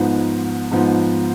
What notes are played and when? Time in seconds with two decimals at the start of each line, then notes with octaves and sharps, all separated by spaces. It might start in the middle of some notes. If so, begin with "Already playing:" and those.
Already playing: G#2 F3 B3 D#4
0.71 G#2 F3 B3 D#4